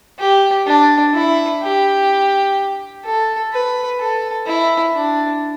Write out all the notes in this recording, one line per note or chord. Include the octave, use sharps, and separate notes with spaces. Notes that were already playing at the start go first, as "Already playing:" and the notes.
G4
D4
E4
G4
A4
B4
A4
E4
D4